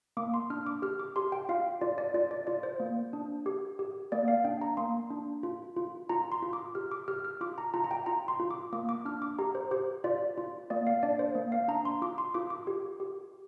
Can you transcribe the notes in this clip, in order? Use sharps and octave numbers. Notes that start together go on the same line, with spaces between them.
A#3 D6
C6
D4 F6
D6
G4 F6
D6
G4 C6
G5
F4 F5
F4 D5
D5
F4 D5
D5
F4 D5
C5
A#3
D4
G4
G4
A#3 D5
F5
D4 G5
A#5
A#3 C6
D4
F4
F4
F4 A#5
C6
F4
D6
G4 F6
D6
G4 F6
F6
F4 D6
A#5
F4 A#5
A#5
G5
F4 A#5
C6
F4
D6
A#3 D6
D6
D4 F6
D6
G4 A#5
C5
G4 C5
F4 D5
F4
A#3 D5
F5
D4 D5
C5
A#3
F5
D4 A#5
C6
F4 D6
C6
F4 D6
D6
G4
G4